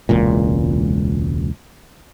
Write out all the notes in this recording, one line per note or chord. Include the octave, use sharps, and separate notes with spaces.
E1 C#2 A#2